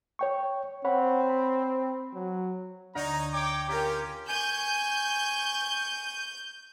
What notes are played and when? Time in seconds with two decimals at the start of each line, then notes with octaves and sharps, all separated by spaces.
0.19 C#5 G5 C#6
0.85 C4 C#5 F#5 B5
1.29 B5
2.14 F#3
2.95 D2 D3 D#4 C#5 D5 A#5
3.33 C#5 G5 D6
3.69 C#4 F4 G4 A#4 A#5
4.29 G#5 C#6 G6 D#7